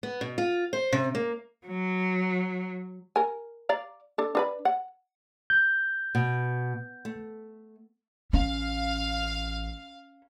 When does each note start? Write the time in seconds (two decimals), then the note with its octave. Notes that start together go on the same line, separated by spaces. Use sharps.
0.03 B3
0.21 B2
0.38 F4
0.73 C5
0.93 C3
1.15 A#3
1.67 F#3
3.16 A#4 G#5
3.69 D5 F5 A#5
4.18 D4 A4
4.35 D4 B4 B5
4.65 F#5
5.50 G6
6.15 B2
7.05 A3
8.33 A1 C#4 F5